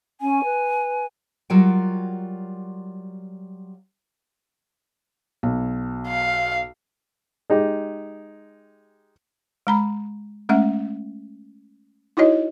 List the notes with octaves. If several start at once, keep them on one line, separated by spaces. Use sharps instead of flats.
C#4 G#5
B4
F#3 G3 F4 F#4 A#4 G5
B1
F5
G#3 D#4 G4
G#3 A#5 B5
G#3 A3 C#4 E5 F#5
D#4 E4 F#4 C#5 D#5